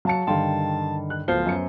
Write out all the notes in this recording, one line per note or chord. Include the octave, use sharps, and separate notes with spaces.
F#3 F5 A5 C#7
G2 D3 D#3 F5 G5 A5 C6
F#6
D1 F3 B3 C5 C7 G7
F#2 C#7